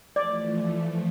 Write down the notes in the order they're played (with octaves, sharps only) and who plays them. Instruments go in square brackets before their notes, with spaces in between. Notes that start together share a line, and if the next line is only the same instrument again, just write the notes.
[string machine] E3 F3 A3 [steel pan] D5